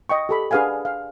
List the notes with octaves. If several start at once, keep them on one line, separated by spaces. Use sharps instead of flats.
D#5 G5 C#6
G4 A4 B5
D4 G#4 B4 F5 F#5 G#5
F5